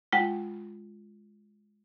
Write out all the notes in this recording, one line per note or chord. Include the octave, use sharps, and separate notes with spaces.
G#3 F4 F#5 G5